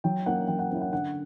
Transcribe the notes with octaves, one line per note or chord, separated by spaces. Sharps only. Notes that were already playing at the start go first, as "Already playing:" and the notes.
F#3 G5
A#3 C#4 E4 F#5
F#3 G5
F#5
A#3 C#4 E4
F#5
D3 F#5